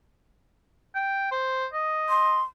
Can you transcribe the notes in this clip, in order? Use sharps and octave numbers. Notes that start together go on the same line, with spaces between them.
G5
C5
D#5
C6